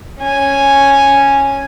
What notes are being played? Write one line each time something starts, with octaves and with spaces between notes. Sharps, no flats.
C#4 G#5